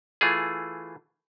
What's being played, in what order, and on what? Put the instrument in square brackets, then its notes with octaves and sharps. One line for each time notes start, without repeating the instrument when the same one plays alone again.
[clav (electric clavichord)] E3 A3 F4 G#4